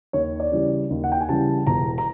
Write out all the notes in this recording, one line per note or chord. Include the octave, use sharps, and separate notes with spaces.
D#2 C#5
D5
C#3 E3 G3
D#2
F#5
G5
G#5
C#3 E3 G3 A5
E1 A#5
A#5